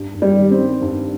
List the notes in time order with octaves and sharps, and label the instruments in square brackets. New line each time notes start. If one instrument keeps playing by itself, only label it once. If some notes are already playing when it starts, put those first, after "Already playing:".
Already playing: [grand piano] G2
G2
[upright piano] G3
[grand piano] D#3
[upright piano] C4
[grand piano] G3
G2